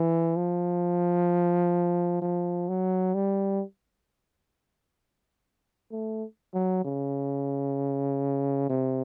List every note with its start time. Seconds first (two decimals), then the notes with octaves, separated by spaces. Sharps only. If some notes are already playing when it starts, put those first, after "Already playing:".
Already playing: E3
0.36 F3
2.21 F3
2.68 F#3
3.14 G3
5.92 A3
6.54 F#3
6.84 C#3
8.69 C3